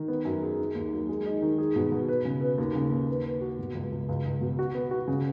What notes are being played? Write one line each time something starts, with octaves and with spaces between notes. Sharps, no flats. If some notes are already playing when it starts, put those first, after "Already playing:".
Already playing: D#3
B3
F#2
G#4
D#3
D#2
F#3
G#3
D#4
D#3
G#4
B2
B2
B4
C#3
B4
D#2
C#3
D#2
B4
B4
F#4
B2
C#2
C#2
C#2
C#2
B2
F#4
B3
F#4
C#3